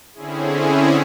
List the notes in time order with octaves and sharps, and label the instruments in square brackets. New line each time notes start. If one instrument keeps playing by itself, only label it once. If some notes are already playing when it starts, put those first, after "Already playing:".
[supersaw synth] D3 C4 C#4 E4 G#4